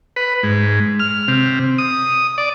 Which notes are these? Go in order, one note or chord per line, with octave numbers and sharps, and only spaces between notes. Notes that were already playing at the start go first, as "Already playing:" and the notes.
B4
G#2
F6
C3
D#6
D5